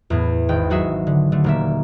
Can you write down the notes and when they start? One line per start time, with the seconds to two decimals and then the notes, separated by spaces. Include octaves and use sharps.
0.10 E2 A2
0.49 G#1 G5 G6
0.70 F#3 F#4 G#4 E5
1.07 D3
1.32 D3 A3
1.44 D#1 A#3 E5